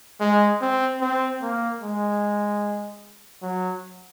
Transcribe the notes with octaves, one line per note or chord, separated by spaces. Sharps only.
G#3
C4
C4
A#3
G#3
F#3